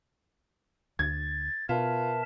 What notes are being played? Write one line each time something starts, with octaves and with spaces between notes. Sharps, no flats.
D2 G#6 A6
B2 F4 A#4 B4 E5 A5